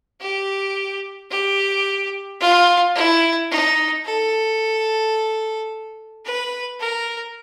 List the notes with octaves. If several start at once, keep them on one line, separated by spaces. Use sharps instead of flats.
G4
G4
F4
E4
D#4
A4
B4
A#4